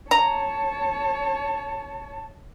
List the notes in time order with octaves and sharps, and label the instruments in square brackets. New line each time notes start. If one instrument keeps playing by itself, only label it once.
[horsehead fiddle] C#5 A5 [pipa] A#5